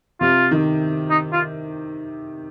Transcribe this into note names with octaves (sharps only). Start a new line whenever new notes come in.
C3 F4
D#3
D#4
F4